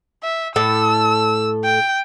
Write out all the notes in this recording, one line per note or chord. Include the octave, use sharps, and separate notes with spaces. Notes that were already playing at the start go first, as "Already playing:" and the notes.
E5
A2 A4 E6
G5